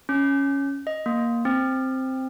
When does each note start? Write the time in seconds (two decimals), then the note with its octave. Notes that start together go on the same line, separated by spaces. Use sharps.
0.09 C#4
0.87 D#5
1.06 A#3
1.45 C4